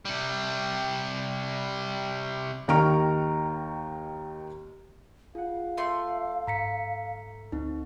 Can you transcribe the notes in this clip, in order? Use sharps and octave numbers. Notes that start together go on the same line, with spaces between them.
C3 G3
D#2 D#3 A#5 C#6 F6 D7
F4 G#4 F5 F#5
A3 E5 C6
G#2 A#5 B6 C#7
D2 C4 D#4